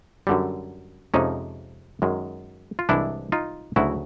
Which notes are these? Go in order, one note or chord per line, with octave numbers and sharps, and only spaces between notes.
F#2 D3 G3
F2 C3 F3 G#3 C#4 D#4
F#2 D#3 G#3
F4
C2 C3 E3 G#3 D4 E4
D#4 F4
D2 C#3 F#3 E4 F#4